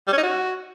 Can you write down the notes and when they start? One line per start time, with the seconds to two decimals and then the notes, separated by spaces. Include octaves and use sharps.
0.07 G3
0.12 C#4
0.18 D#4
0.23 F#4